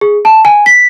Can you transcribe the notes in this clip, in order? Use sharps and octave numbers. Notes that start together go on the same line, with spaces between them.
G#4
A5
G#5
B6